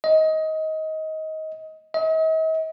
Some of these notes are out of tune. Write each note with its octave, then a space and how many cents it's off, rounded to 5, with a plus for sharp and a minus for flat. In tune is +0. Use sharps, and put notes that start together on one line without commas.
D#5 +20
D#5 +45